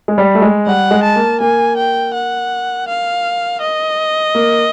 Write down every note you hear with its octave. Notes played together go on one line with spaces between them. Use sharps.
G#3
G3
A3
G#3
G3 F#5
G#3
A5
A#3
A#3 G#5
G5
F#5
F5
D#5
A#3